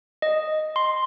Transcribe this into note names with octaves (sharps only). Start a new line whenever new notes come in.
D#5
C6